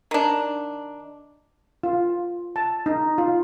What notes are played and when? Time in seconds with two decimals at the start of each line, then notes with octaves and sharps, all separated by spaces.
0.11 D#3 D4
1.83 F4
2.56 A5
2.86 D#4
3.18 F4